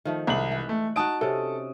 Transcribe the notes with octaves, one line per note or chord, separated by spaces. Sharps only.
D#3 F3 A3
C2 G#3 F#7
E3
A3
D#4 F#4 A5 D#6 D7
C3 C#4 A4